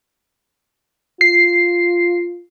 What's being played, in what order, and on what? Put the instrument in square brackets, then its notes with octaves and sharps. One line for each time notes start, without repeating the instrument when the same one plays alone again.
[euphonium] F4 [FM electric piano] C7